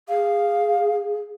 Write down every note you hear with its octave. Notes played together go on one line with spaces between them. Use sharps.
G#4 F5